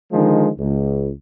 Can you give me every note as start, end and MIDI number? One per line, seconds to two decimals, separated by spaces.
0.12 0.48 50
0.12 0.48 51
0.12 0.48 53
0.12 0.48 56
0.59 1.08 37